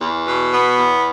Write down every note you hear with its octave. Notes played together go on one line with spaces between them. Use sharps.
E2
B2
B3
E2